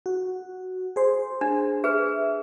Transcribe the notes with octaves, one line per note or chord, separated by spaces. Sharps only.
F#4
G#4 C5
D4
G#4 B4 E5